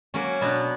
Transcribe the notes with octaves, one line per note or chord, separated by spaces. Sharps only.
F#3 A#3 C#4
B2 B3 D4